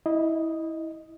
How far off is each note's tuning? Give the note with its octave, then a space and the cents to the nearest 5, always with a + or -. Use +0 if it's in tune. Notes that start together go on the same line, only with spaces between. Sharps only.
E4 -20 D#5 +0